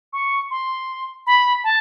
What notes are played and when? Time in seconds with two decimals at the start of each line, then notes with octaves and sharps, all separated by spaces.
0.13 C#6
0.51 C6
1.27 B5
1.64 A5